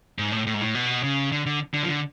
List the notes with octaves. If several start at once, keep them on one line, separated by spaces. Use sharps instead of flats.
G#2
A2
A2
G#2
A2
B2
C#3
D3
D3
D3
F3
D3